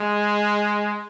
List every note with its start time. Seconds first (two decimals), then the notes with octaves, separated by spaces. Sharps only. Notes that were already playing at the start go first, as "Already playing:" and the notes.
Already playing: G#3